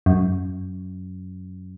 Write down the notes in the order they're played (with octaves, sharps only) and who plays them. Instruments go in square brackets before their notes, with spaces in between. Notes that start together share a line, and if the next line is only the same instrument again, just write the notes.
[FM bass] F#2